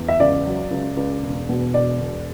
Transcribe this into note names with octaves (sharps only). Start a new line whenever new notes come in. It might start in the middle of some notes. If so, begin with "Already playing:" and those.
Already playing: E2
E5
C#2 D5
F#3
C#2
C#2
E1
B2
E1 D5
E1